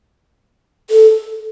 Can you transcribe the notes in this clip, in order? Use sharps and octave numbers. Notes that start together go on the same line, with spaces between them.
A4